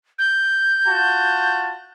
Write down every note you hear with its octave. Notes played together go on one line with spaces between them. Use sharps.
G6
F4 F#4 A5